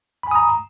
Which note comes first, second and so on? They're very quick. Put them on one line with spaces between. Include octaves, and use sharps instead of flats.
B5 G#5 D#6 A#5